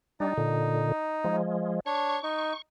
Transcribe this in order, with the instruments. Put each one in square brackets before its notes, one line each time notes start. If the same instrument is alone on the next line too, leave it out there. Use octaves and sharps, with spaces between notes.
[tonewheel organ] G3 D4 [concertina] D#4
[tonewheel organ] A#2 D3
F3 G#3
[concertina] D4 C#5 [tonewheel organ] C#6
[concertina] D#4